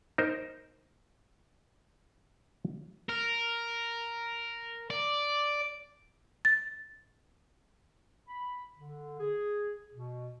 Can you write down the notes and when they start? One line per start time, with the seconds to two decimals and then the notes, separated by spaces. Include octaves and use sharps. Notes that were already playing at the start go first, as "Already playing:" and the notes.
0.18 D#4 A#4 C5
3.09 A#4
4.90 D5
6.45 A6
8.28 B5
8.77 D3
9.20 G#4
9.94 B2